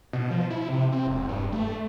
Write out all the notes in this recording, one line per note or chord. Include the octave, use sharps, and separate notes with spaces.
B2
F3
E4
C3
C4
E1
G2
A3